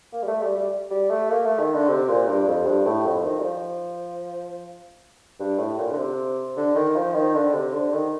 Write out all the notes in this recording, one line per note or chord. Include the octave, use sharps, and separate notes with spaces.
A#3
G3
A3
G3
G3
G3
A3
A#3
A3
D#3
D3
C3
A#2
G2
F2
G2
A2
F2
D#3
G3
F3
G2
A2
A#2
D3
C3
D3
D#3
F3
D#3
D3
C3
D3
D#3